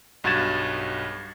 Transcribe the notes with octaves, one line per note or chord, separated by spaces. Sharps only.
B1 G2 F#4 G#6 A6 E7